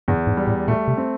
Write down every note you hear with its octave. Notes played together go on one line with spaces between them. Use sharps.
E2 G2
G#2
G3
A2
A#2 A3
C3
C4